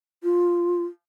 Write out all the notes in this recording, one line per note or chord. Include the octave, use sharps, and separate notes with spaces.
F4